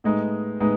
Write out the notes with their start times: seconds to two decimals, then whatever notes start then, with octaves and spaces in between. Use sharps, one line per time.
0.04 A2 G#3 B3 D#4
0.60 A2 G#3 B3 D#4